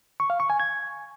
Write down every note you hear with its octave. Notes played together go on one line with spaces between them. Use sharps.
C#6
F5
C#6
G#5
G#6